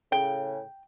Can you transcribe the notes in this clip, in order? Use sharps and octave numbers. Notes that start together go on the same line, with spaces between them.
A2 C#3 G5